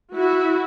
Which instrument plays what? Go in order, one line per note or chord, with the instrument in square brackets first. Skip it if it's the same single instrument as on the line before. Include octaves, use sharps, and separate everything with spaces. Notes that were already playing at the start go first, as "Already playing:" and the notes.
[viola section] E4 F#4